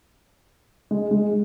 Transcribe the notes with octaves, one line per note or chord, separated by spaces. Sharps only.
G#3
G#3